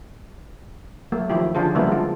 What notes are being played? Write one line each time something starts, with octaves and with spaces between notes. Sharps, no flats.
F#3 A3 A#3
D#3 F3 E4 G4
D3 F3 D4 F4 G#4 C5
C#3 F3 G3 A#3 B3 E4
G#3 F4